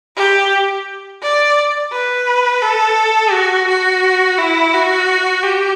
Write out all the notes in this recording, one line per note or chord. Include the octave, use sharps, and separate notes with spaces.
G4
D5
B4
A4
F#4
F#4
E4
F#4
G4